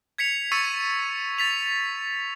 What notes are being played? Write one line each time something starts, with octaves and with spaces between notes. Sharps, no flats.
G#6 B6 C#7 F7
C#6 E6 A6 B6 C#7 D#7
A6 B6 F7